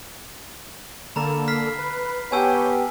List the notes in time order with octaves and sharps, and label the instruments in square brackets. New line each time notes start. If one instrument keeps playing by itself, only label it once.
[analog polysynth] D3 A#3 A4 [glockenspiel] A#5 B5
[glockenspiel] F6 B6 C7
[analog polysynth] B4
[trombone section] B3 G4 [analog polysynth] C#5 G6 [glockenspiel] G#5 A5 E6